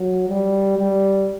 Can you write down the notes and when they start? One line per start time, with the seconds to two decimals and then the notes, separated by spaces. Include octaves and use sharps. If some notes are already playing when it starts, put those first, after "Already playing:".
Already playing: F#3
0.28 G3
0.78 G3